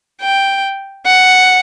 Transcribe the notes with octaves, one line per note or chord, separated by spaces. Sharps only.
G5
F#5